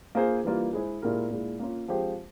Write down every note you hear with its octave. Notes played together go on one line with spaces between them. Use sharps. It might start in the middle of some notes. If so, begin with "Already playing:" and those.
A#3 F4 G#4 C5
E3 G3 A#3 F4
G#3 E4 G#4 C5
A#2 G#3 E4 G4 A#4
A#2 G#3 E4
A#3 C#4 F4
F3 G#3 C4 G4 C5